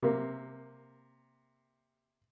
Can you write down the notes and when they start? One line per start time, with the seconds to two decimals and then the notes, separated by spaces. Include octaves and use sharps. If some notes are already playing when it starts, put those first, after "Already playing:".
0.02 C3 A#3